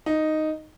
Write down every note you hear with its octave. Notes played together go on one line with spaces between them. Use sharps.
D#4